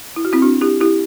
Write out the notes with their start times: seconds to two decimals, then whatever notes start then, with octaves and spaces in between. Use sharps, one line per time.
0.16 E4
0.25 F#4
0.33 C4 E4
0.42 D4 F#4
0.61 E4 G4
0.81 E4 G4